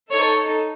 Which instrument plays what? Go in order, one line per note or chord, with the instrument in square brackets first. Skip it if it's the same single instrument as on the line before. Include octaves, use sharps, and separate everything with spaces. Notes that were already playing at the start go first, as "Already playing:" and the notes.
[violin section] D#4 A4 C#5